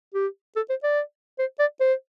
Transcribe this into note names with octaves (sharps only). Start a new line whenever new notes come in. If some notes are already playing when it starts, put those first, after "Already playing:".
G4
A4
C5
D5
C5
D5
C5